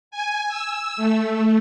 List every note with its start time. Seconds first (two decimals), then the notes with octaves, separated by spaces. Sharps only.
0.11 G#5
0.49 E6
0.97 A3